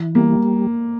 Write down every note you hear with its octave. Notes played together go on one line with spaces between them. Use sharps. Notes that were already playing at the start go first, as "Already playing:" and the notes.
Already playing: E3
G3 A#3